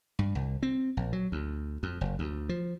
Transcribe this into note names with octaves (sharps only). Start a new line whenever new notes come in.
G2
C2
C4
A#1
F#3
D2
F2
F#1
D2
F3